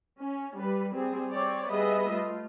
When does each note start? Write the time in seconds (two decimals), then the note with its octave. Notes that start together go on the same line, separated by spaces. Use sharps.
0.19 C#4
0.58 G3 B4
0.95 G3 C4 G#4
1.31 C4 C#5 D5
1.69 G3 B3 G#4 B4 D#5 E5
2.10 A3 F4